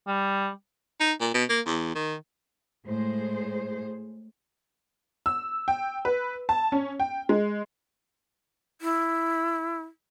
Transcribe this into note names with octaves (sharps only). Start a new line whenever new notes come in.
G3
D#4
A#2
B2
A#3
E2
D#3
A2 G#3 G#4 C5
E6
G5
B4
A5
C#4
G5
G#3
E4